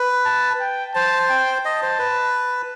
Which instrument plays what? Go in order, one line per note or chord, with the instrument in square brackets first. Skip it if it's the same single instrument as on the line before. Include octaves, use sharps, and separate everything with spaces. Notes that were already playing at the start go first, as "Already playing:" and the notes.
Already playing: [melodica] B4
[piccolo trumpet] A5
G5
[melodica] C5 [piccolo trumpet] A5
[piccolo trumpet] G5
[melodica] D#5 [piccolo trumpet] A5
[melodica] C5
B4